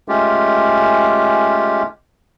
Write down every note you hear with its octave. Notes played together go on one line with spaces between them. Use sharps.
G#3 A3 C#4 F4 G4